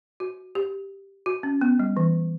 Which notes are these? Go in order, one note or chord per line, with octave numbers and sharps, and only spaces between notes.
F#4
G4
F#4
C#4
B3
G3
E3